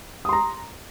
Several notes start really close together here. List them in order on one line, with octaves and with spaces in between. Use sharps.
D#6 C6 A#5